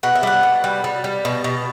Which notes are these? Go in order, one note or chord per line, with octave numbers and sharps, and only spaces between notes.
B2 F#5
E5
G3 F#5
B2
G3
G3
G3
B2
B2